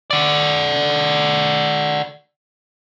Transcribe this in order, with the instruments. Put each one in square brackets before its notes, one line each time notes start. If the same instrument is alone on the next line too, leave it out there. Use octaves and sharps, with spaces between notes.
[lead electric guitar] F#4 D5